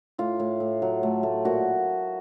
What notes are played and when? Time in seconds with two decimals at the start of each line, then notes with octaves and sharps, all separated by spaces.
0.18 A2 F4
0.40 A2
0.60 A2
0.82 F#3
1.03 A3
1.23 A3
1.45 A#2 F#4